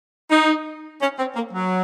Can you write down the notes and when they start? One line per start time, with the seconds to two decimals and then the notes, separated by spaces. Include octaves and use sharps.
0.30 D#4
1.01 C#4
1.18 C4
1.36 A#3
1.53 F#3